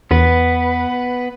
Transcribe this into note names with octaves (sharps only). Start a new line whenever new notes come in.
E2 B3 B4